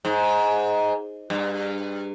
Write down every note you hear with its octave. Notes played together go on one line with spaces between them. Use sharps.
G#2
G2